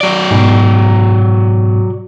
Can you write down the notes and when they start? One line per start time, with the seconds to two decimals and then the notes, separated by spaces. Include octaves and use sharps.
0.01 F#3 D5
0.31 G#2 B2